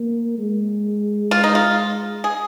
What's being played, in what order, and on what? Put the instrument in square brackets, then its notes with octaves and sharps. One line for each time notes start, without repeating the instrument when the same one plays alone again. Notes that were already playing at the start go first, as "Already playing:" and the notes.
Already playing: [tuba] A#3
G#3
[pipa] F4
D#4
F4
G#4